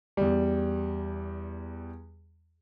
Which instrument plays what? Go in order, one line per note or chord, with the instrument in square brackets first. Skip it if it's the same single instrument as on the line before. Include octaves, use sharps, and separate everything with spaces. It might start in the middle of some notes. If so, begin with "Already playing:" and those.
[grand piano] E2 G3